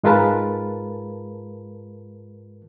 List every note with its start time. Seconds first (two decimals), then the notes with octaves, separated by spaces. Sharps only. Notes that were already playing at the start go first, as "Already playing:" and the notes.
0.03 G#2 G#3 F4 A#4 B4 A5